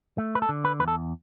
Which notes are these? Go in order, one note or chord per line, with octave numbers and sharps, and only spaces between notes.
A3
B4
A4
D3
B4
E2 B4
A4